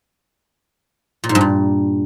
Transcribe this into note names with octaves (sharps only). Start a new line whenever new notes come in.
A#2
G#2
G2
A#2